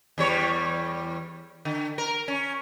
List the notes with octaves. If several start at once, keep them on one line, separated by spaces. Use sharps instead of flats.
E2 G3 C#5
D3
A#4
C#4